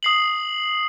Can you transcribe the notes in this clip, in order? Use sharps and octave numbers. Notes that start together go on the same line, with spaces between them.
D#6 C7 F#7